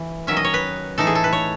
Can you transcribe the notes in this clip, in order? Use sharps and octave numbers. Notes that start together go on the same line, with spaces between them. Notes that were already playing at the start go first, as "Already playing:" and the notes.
Already playing: E3
D#3 F#3 C#4 E5
D#5
C#5
B4
A2 E3 A3 D#4 A4
G#4
A4
B4
C#5